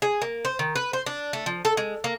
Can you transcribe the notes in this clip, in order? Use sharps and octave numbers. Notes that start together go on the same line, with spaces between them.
G#4
A#3
C5
D#3
B4
C5
D4
A3
F3
A4
G#3
A#3